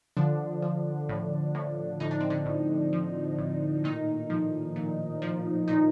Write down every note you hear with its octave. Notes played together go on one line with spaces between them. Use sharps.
D3 F3 D4
F3
A2
A2
A2 D#4
D4
C4
D3 D4
A2
F3
A2
A#2 D#3 D#4
F3
A#2
F3
A#2 D#3 D#4